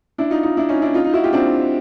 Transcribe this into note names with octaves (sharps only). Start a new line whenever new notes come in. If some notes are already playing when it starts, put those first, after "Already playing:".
D4 E4
D#4 F4
D#4 F4
D4 E4
C#4 D#4
D4 E4
D#4 F4
D#4 F4
E4 F#4
F4 G4
C4 D4